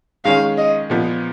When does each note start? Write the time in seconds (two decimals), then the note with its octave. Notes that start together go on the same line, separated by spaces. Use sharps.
0.25 D#3 G#3 C#4 F5
0.58 D#5
0.90 A#2 F3 B3